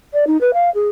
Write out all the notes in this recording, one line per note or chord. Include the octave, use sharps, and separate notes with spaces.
D5
D#4
B4
F5
G#4